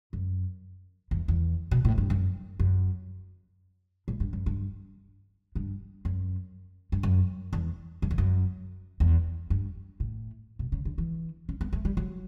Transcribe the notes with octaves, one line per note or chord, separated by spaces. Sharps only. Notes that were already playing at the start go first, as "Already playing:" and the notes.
F#2
E2
E2
B2
A2
G2
F#2
F#2
A2
G2
F#2
G2
G2
F#2
G2
F#2
E2
F#2
E2
F#2
E2
G2
A2
B2
C#3
D3
E3
C#4
B3
A3
G3
F#3